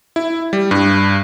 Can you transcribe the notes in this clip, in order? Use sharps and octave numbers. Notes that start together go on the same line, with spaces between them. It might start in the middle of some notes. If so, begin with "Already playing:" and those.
E4
G3
G2